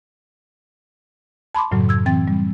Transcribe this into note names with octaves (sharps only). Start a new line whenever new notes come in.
A5 B5 C6 D6
F#2 A2 C#3 F#3
E6 G#6
E3 C4 G5 A6
G3